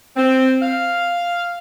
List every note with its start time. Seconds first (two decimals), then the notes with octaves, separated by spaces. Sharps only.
0.16 C4
0.62 F5